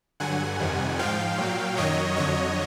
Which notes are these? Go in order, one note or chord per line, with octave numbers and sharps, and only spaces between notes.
G2 D3 F#3 F#5 G#5
F2 C3 D#3 G3
G#2 F3 F5 G5
A#2 F#3
F#2 D#3 F#3 C#5 D#5
F2 D3 F#3 C#5 D#5